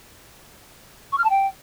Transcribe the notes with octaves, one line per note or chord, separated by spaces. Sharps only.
C#6
F6
A5
G5